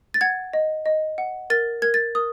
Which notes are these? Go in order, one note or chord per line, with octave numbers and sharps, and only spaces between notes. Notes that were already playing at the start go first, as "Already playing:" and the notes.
A6
F#5 G#6
D#5
D#5
F#5
A#4 A6
A#4 G#6
A6
A#4 D#6